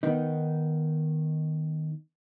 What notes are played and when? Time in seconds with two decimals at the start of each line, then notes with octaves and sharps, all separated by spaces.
0.03 D#3 B3 D#4